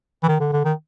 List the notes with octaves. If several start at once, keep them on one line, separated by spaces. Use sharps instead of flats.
E3
D#3
D3
D3
D#3